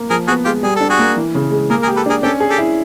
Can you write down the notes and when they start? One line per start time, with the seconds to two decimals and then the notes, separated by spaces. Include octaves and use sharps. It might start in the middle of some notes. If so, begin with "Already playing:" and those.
Already playing: A#3
0.10 F3 G#4 A#4
0.27 B3 F#4 G#4
0.45 G#3 F4 G4
0.63 G3 G#4
0.76 D4 A4
0.89 F#4 G#4
0.99 A#3
1.17 E3
1.35 C#3
1.51 G#3
1.70 A#3 G#4 A#4
1.82 G#4 A#4
1.87 G4
1.96 A4 B4
2.06 D4 G#4 A#4
2.23 C#4 G4 A4
2.40 G#4
2.49 G4 A4
2.58 E4